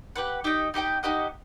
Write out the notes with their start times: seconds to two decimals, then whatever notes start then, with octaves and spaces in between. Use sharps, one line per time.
0.16 G4 B4 F#5
0.44 D#4 G4 D#5 G5
0.74 D#4 G4 D#5 G5
1.03 D#4 G4 D#5 F#5